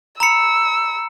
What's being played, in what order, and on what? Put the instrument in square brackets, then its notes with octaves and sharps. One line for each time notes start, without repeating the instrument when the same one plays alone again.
[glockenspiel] A#5 B5 C#7 [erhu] E6